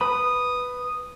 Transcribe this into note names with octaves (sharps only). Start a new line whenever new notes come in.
B4 B5 D#6